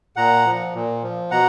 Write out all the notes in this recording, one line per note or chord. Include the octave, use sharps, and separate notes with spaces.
A#2 F#5 A#5
F3
A#2
F3
B2 F#5 A#5